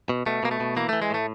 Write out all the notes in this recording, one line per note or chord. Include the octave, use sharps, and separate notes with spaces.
B2
B2 A3
B2 A#3
A3
B2
E3 A#3
E3 A3
G#3
A2 A3